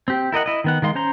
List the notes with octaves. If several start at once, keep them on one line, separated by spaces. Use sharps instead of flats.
C4 G4
E4 A#4 D#5 F#5
E4 D#5
D#3 B3 F#5
D#3 G#3 F5 C6
C#4 C5 A#5 C6